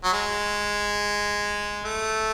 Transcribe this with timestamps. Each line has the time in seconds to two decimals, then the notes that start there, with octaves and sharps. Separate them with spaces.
0.04 F#3
0.13 G#3
1.85 A3